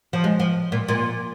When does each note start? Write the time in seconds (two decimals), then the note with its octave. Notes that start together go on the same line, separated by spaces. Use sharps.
0.13 F3
0.24 G#3
0.40 F3
0.72 A#2
0.88 A#2